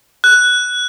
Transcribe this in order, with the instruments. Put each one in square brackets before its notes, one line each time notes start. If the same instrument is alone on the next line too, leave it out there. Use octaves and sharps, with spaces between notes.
[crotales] F#6